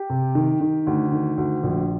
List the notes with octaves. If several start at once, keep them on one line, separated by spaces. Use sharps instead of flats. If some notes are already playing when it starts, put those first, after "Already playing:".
Already playing: G4
C3
D#3
D#3
D2
D#3
D2
A#1